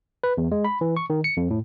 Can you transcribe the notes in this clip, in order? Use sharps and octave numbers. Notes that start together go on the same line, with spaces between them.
B4
E2
G#3
B5
E3
C#6
D#3
C#7
F2
A2